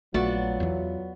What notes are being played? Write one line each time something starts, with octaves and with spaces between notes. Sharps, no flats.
A#1 F#3 A3 B3 F4 F#4 D5
E2 E3